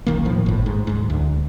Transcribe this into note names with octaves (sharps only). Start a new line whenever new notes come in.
D#1 B1 D#3 A#3
A2 F3
G1 A2
G#2
D1 G#2
D2